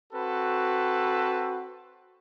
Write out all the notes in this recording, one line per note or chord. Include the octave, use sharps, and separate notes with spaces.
C4 F#4 A4 B4